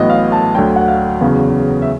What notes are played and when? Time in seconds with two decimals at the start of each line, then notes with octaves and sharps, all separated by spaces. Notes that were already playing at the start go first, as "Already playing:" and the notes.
Already playing: A1 A2 F#3 B3 D#5
0.10 F5
0.32 A5
0.55 D2 D3 F#3 G5
0.76 F#5
0.88 F5
1.21 E2 C#3 F#3 B3 F5
1.82 E5